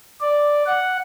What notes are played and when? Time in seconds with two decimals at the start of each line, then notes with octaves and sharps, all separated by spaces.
0.20 D5
0.66 F#5